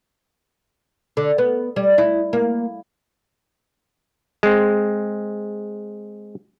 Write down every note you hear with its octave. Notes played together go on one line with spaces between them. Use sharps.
D3
B3
G3
E4
A#3
G#3 C4